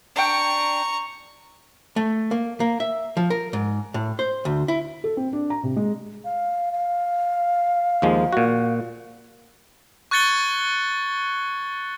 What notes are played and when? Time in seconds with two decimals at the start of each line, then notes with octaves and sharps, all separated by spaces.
0.16 D4 G5 A#5 C#6
1.96 A3
2.31 A#3
2.60 A#3
2.80 E5
3.17 F3
3.30 A#4
3.53 G#2
3.94 A2
4.19 C5
4.45 D2
4.68 E4
5.04 A4
5.17 C4
5.33 D4
5.50 A#5
5.63 C3
5.76 G#3
6.25 F5
6.72 F5
8.02 D#2 F3 G#3
8.33 A#2 F#4
10.11 C#6 F#6 G#6 A6 C#7 G7